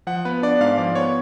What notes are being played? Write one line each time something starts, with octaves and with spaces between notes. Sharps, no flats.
F3 F#5
B3 B4
D4 D5
G#2 F5
F3 D5
B3 C#5